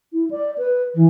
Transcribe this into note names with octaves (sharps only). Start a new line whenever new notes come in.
E4
D5
B4
E3